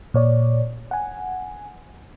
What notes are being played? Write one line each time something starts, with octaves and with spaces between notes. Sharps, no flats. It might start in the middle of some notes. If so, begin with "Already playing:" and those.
A#2 C#5 D5
F#5 G#5